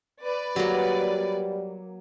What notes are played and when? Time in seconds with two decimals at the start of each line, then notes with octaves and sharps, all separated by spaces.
0.23 B4 D5
0.56 F#3 G3 A#3